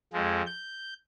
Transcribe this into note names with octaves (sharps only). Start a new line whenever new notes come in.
F2 F3 G#3
G6